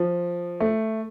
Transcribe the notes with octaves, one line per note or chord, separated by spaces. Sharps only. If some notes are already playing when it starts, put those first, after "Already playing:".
Already playing: F3
A3